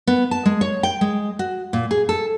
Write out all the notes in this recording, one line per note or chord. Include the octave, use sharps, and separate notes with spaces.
B3
A5
G#3
C#5
G5
G#3
F#4
A#2
G#4
A4